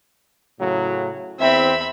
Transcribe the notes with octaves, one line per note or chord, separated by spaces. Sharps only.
A2 C#3 F#3
E2 C4 E5 B5